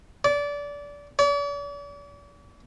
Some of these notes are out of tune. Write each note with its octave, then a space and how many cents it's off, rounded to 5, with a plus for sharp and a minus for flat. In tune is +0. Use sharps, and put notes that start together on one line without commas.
D5 -25
D5 -45